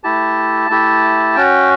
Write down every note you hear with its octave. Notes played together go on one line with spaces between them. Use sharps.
A3 E4 G4 A5
A3 E4 G4
C#4 F#4 G5